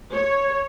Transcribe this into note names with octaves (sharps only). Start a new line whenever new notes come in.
C#5